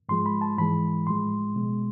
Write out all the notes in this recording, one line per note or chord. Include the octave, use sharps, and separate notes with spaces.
G#2 F3 G#3 C6
B5
A5
G#2 E3 G#3 B5
A2 F3 G#3 C6
B2 G#3